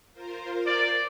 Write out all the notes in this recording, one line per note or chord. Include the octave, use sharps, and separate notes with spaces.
F4 A#4 C5
D5